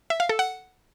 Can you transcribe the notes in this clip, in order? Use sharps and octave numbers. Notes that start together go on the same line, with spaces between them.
E5
F5
A4
F#5